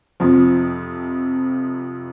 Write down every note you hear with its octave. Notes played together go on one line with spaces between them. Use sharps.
F2 C3 F3